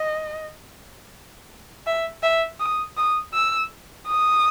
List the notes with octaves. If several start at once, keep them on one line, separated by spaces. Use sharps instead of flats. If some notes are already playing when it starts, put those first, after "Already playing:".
Already playing: D#5
E5
E5
D#6
D#6
E6
D#6